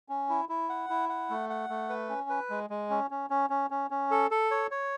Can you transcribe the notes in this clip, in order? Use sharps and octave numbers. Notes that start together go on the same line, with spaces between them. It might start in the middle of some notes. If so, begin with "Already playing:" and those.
C#4
E4
E4
F#5
E4
F#5
A3
F#5
A3
B4
C#4
B4
G#3
G#3
C#4
C#4
C#4
C#4
C#4
C#4
A4
A4
C#5
C#5